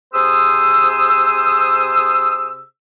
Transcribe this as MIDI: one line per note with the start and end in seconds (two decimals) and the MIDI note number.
0.14 2.62 48
0.14 2.62 68
0.14 2.62 72
0.14 2.62 87
0.14 2.62 88